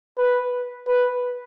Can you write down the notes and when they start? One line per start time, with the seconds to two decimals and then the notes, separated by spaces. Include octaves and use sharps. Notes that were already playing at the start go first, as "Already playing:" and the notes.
0.18 B4
0.88 B4